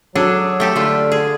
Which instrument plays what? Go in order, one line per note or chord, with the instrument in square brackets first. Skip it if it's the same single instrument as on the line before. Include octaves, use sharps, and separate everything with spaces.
[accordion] F#3 [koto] D4 G#4 A4
[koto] A3 G4 A4
[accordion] D3 [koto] A3 F4
[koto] G#4